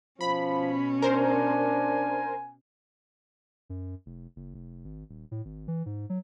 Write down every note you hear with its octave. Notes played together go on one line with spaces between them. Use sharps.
B2 F3 C#4 B5
D4 A#4 C5 G#5
F#2
F1
F#1
F1
G#1
D#1
A2
G#1
E3
G#2
F#3